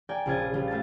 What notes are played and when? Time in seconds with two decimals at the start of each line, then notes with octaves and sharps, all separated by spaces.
0.09 A#4 D5 G5 G#5
0.26 A#1 C#3 F4 D#5 G#6 A6
0.38 G#4
0.53 C#3 G3 F4 G#4
0.68 A3 F5 A5 A6